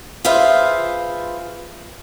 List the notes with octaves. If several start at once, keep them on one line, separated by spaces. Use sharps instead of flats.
F4 G#4 B4 C5 E5 F5